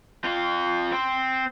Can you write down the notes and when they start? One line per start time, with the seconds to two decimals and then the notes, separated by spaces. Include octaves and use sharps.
0.24 C4 F4
0.92 C4